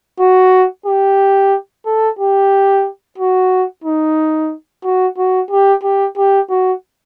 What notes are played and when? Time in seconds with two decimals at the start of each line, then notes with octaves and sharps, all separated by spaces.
0.20 F#4
0.86 G4
1.86 A4
2.19 G4
3.18 F#4
3.84 D#4
4.84 F#4
5.18 F#4
5.51 G4
5.83 G4
6.17 G4
6.50 F#4